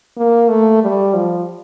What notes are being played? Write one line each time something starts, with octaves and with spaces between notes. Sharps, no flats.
A#3
A3
G3
F3